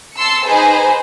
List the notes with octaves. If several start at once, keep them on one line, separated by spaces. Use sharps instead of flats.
A5 C6 E6 C#7
D#4 G#4 B4 C5